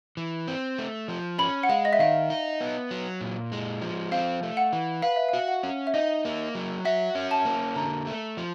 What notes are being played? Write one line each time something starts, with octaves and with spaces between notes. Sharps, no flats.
E3
C4
A3
F3
C#4 B5
F#5
G#3 F5
D#5
E5
D#3 F5
D#4
B3
F#3
A#2
G#3
F3
C4 F5
A3
F#5
E3
B4 F5
E5
F5
F#4
F#5
C#4
E5
D#4 D#5
A#3
F#3
F#4 E5
C#4
A5
A#3
D3 A#5
A3
F3